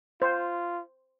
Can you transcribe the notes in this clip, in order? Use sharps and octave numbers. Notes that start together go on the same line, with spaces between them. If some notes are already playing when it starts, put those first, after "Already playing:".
F4 C5